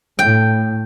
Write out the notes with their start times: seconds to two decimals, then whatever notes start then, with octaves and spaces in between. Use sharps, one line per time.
0.19 A2 G5